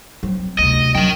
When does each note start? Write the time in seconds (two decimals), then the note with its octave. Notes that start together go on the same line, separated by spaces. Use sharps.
0.23 F#3 C4
0.59 D2 C3 D#5
0.95 F#2 F#3 A#4 G5